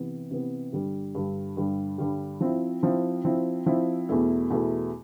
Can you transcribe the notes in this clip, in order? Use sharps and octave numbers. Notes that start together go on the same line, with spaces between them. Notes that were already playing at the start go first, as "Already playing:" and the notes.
Already playing: C3 E3 B3
C3 E3 B3
G2 D3 G3
G2 D3 G3
G2 D3 G3
G2 D3 G3
F3 C4 E4
F3 C4 E4
F3 C4 E4
F3 C4 E4
E2 B2 A3 E4
E2 B2 A3 E4